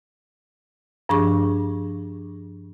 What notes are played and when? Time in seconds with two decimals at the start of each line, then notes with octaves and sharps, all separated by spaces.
1.09 G2 F3 D4 G#4 C#6